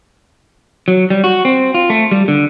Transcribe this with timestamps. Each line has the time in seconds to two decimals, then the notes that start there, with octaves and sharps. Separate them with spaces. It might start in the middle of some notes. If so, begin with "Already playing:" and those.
0.88 F#3
1.10 G3
1.24 F#4
1.45 C4
1.74 F4
1.90 A3
2.11 G3
2.28 D3